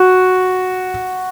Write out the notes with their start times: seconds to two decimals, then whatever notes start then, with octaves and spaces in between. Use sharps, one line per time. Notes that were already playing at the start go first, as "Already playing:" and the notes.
Already playing: F#4